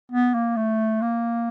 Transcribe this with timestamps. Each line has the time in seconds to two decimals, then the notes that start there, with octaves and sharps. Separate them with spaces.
0.12 B3
0.34 A#3
0.57 A3
1.02 A#3